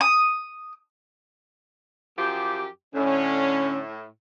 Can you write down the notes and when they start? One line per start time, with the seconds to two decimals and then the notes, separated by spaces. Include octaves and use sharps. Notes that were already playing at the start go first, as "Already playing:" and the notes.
0.01 D#6
2.18 F#2 F3 G4
2.95 A2 D3 C#4